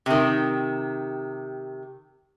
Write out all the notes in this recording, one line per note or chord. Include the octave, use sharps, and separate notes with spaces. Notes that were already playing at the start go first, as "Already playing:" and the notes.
C3 D#3